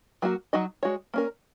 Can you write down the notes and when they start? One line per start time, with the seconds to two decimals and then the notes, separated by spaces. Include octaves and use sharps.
0.22 F#3 A#3 F#4
0.53 F#3 D#4 F#4 D#5
0.83 G#3 F#4 C#5
1.14 A#3 C#4 A#4